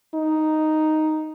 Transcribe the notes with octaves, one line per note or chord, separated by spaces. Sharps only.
D#4